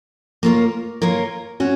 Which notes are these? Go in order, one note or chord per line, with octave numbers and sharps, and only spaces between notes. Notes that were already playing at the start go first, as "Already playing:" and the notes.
A#3 F4 A#4 C#5
A#3 F4 A#4 C#5
C#4 F#4